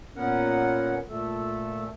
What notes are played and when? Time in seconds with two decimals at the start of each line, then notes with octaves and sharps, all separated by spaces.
0.16 A#2 B3 C#4 A#4 F#5
1.09 A#2 A3 A4